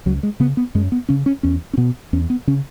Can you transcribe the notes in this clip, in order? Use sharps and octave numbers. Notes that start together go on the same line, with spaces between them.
C#2 F#3
G#3
C#3 B3
B3
F#2 G#3
B3
C#3 C#4
C#4
E2 C#4
C#4
B2 B3
E2 C#4
B3
C#3 C#4